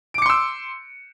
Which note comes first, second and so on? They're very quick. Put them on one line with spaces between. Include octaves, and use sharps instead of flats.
D7 D6 C#7 C6 E6